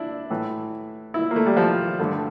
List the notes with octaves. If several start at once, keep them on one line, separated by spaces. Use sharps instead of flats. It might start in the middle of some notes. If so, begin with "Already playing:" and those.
Already playing: D4 E4
A2 E3
E4
A#3
A3
G3
F3
G2 D3 A3